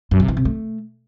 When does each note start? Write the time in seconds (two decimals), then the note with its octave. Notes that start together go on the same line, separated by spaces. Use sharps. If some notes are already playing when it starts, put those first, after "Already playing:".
0.11 F#2
0.20 C3
0.28 E3
0.37 C3
0.45 A3